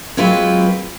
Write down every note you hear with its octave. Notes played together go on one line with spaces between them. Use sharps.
F#3 G#3 C4 F4 B4